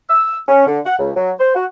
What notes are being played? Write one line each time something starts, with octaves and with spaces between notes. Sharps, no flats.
E6
C#4
D3
F#5
C#2
F#3
C5
F#4